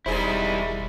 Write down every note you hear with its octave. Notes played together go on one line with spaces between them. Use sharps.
E1 G3 D#4 E4 G#4 C5